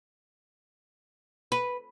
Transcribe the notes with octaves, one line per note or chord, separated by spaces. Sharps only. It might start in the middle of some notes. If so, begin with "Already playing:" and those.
B4